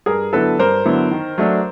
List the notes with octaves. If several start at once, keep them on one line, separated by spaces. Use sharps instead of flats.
G2 G#4 A#4
D3 F#3 B3 E4 A4 B4
G2 A#4 C5
D3 F#3 B3 E4
D#3
F#3 A3 D4